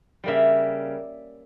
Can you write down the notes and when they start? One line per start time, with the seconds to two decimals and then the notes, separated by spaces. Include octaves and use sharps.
0.24 C#3 G3 A#3 E5